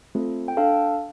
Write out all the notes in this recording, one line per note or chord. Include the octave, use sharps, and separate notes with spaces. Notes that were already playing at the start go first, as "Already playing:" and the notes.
A3 C4 F4 A4
G5
D4 A4 F5 A5